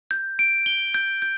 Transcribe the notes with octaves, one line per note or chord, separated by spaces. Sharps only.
G6
D7
G7
G6
G6